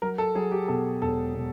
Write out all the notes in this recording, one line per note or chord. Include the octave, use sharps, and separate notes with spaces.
F#3 A#4
A4
F#3 G#4
G4
B2 A4
E1 A4
B2